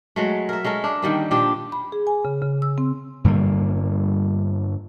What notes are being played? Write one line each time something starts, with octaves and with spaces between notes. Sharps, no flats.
F#3 G#3 A3
A#4 E5
G#3 C#4 A4 A#4
D4
D3 D#3 G3 A#3
A#2 F3 D4 G4
B5
G#4
G#5
C#3
C#3
E6
C4
G2 D3 G3 A#3